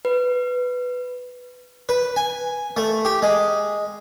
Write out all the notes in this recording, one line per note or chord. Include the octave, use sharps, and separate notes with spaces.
B4
B4
G#5
A3
G4
G#3